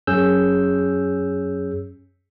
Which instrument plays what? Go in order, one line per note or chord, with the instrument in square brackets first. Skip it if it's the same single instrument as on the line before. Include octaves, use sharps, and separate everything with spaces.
[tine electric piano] F#2 C#4 G#4 E6 G6